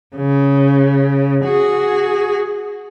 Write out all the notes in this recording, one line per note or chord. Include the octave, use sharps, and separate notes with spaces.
C#3
F#4 G#4